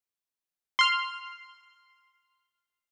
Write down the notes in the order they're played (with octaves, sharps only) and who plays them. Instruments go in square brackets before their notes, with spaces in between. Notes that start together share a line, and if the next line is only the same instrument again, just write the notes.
[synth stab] C6 F6